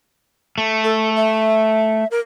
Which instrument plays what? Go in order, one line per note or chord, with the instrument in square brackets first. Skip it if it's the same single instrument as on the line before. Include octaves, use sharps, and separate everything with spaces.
[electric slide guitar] A3
[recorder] A4
E5
A#4